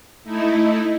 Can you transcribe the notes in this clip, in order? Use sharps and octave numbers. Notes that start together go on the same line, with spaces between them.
A3 D#4 E4